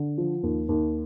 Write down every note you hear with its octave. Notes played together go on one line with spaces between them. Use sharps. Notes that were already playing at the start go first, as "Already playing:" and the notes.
Already playing: D3
F3
D#2
D#2